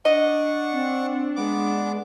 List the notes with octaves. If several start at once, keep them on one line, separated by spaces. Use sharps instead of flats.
D4 D#5 F#5 C#6
C4
G#3 B3 D6